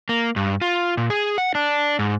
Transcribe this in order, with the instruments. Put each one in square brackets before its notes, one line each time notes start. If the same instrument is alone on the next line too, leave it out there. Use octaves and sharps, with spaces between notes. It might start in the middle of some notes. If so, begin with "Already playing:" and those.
[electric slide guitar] A#3
G2
F4
A#2
G#4
F#5
D4
G#2